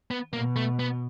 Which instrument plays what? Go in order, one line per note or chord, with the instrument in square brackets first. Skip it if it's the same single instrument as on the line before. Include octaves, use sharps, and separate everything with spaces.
[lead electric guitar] B3
[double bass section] B2 [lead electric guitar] A#3
[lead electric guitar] A3
B3